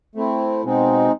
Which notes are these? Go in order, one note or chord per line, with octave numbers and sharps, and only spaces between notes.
A3 C4 E4
B2 G#3 C4 D#4